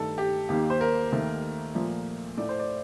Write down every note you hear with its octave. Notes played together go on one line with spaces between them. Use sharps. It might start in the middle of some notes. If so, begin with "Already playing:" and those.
Already playing: G2 D#3 A3 A4
G4
D#2 D#3 A#3 G4
C5
A#4
D#2 D#3 A3
A#2 F3 A3
A2 A3 D5
C5
D5